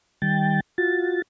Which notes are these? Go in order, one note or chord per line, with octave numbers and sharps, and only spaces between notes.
D#3 G3 G5 A6
F4 F#4 A6